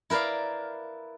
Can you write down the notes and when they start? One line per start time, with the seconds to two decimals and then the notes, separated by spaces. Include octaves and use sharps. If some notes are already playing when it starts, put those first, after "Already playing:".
0.10 E4 A#4 B4 D5 F5